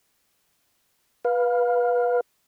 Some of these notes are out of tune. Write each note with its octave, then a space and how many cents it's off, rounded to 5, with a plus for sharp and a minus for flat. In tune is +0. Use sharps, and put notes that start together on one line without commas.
B4 -15 F5 +15